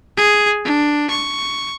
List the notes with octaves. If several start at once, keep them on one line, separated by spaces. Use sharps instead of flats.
G#4
D4
C#6